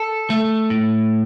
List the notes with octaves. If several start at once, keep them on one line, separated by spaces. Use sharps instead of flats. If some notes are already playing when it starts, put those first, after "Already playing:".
Already playing: A4
A3
A2